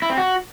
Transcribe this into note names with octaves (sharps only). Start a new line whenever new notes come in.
E4
C4
F#4